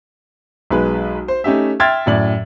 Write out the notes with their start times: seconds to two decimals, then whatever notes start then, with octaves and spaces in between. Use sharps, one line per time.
0.71 B1 G#3 B4
1.28 C5
1.44 A3 C#4 D#4 G4 E5
1.80 E5 G5 C6 F6 G#6 A6
2.06 F#2 A2 D5 F#7